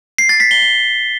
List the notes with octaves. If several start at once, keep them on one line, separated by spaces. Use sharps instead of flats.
C7
A6
B6
G7
G7